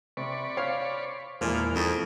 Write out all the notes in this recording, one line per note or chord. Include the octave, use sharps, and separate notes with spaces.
C3 D5 B5 C#6
C5 C#5 F5
E2 A#2 F3 G#3 E4 F5
F2 D#4